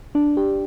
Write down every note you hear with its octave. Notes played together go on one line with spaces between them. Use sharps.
D4
G4